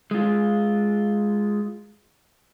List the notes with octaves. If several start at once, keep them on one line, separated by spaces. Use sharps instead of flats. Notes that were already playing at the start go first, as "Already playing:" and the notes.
G#3 F4